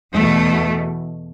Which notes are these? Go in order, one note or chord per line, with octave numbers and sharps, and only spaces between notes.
E2 B2 A3